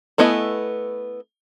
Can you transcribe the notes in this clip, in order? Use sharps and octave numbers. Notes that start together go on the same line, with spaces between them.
A3 B3 E4 D#5 G#5